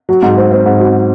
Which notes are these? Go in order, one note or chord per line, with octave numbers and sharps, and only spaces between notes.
F#3
G#2
C4
C4
G#2
F#3